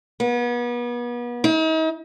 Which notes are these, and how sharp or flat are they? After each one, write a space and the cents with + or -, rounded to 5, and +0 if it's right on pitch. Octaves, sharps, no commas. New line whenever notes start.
B3 -35
D#4 +40